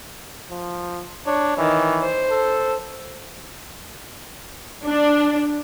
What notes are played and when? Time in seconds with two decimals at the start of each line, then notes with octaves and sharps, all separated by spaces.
0.51 F3
1.26 D4 C#5
1.58 D#3 E3
2.02 C5
2.30 A4
4.86 D4